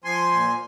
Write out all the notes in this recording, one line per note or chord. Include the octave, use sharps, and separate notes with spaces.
F3 G#5 C6
A#2